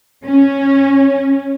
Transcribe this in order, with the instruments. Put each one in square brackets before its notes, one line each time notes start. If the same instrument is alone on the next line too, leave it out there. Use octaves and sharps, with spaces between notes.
[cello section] C#4